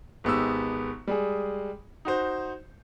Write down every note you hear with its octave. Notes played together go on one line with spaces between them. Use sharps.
G#1 G#3 B3 D#4 G4 E6
G3 G#3 G#4
D#4 F#4 C5